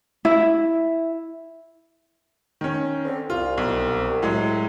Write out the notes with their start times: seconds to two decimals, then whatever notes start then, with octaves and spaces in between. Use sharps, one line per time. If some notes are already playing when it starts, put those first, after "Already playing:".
0.25 E4
2.61 D#3 C#4
3.05 D3 C4
3.30 C2 F4
3.58 B1
4.23 A2 F#3 G#3